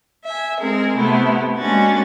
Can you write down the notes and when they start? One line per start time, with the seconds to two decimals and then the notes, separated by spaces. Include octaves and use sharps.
0.25 E5 G#5
0.60 G#3 C4 G#4 A#4
0.96 C3 A3 B3 E4
1.57 G#3 A#3 C#4 D4 F#4 A6